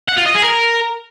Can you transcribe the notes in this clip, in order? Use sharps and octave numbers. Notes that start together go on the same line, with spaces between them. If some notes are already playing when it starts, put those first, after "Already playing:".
F#5
F4
D#5
G#4
A#4